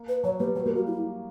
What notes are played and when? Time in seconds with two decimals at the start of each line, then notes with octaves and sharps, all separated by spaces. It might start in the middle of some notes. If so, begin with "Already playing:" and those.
Already playing: A#3
0.08 B4
0.24 F#3 C#5
0.40 G3 B4
0.56 F#3 B4
0.65 G3 A#4
0.76 A#3 F#4
0.87 E4